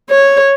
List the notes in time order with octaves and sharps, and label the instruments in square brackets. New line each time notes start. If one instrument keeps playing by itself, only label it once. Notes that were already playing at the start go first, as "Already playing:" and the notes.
[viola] C#5